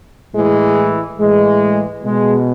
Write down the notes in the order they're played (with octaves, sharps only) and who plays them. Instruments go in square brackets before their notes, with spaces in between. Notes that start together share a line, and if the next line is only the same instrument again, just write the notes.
[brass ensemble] A2 E3 G#3
A2 E3 G#3
B2 G#3